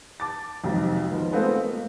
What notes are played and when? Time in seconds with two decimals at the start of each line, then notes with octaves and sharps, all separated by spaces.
0.20 A5 D6 A6
0.64 B1 F2 G#2 C3 D#3
1.11 D#3 F3 B3
1.31 G#3 A3 B3 C4 F4 A4
1.64 A#3